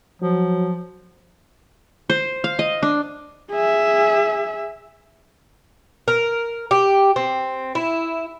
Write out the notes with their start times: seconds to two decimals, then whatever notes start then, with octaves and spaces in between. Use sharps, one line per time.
0.22 F3 F#3
2.10 C5
2.44 F5
2.59 D#5
2.83 D4
3.51 G#4 E5
6.08 A#4
6.71 G4
7.16 C4
7.75 E4